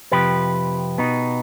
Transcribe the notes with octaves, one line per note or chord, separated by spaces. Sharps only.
F2 C3 F3 G4 B4
B2 B3 D#4